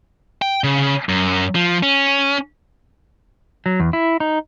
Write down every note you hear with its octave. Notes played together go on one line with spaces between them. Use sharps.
G5
C#3
F#2
F3
C#4
F#3
E2
E4
D#4